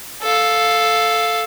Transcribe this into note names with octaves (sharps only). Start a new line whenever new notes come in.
A4 F5